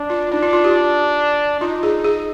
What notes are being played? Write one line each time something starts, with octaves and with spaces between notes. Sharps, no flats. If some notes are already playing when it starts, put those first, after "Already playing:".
Already playing: D4
F4
D4 D#4
F4
F4
G4
D#4 F4
G#4
G#4